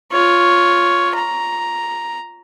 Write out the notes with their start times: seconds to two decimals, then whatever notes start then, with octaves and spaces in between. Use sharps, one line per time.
0.12 F4 C#5
1.15 A#5